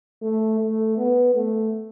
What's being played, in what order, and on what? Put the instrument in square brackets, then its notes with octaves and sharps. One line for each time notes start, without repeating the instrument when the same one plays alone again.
[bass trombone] A3
A3
B3
A3